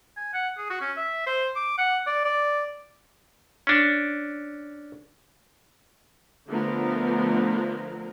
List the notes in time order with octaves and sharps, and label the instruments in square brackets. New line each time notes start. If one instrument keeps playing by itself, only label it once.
[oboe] G#5
F#5
G#4
F#4
C#4
E5
C5
D6
F#5
D5
D5
[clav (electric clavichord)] C#4 D4
[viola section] D3 F3 A3 B3 A#4